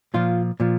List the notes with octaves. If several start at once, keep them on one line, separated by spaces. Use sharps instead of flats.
A#2 F3 F4
A#2 F3